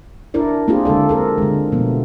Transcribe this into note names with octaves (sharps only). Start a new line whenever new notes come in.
D4 E4 A#4 D5
A#3 C4 D4 F4 G4 G#4
D3 G#3 A4 D5
C4 A4 A#4
D3 G#3
B2 F3 A3 B3